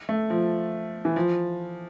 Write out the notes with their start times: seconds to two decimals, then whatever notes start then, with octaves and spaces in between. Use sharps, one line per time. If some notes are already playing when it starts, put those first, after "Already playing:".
0.09 A3
0.30 F3
1.05 E3
1.16 F3